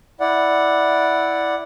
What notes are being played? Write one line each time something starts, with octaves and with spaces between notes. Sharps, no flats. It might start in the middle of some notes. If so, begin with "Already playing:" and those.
E4 D5 F#5